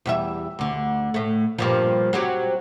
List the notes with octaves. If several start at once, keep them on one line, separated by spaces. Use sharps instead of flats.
E2 G3 E5
D2 D3
A2 A3
G2 A#2 F3
F#3 C4 G4